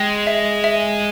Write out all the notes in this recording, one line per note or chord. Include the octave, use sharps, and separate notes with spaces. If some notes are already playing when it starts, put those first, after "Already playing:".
Already playing: G#3 G5
E5
E5